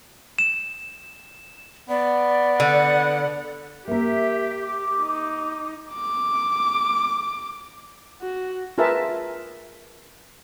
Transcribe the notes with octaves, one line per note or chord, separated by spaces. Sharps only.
E7
B3 D5
D3 F#5
A#3 G4 A#4 E5
D6
D#4
D6
F#4
F4 G#4 A#4 B4 E5 A5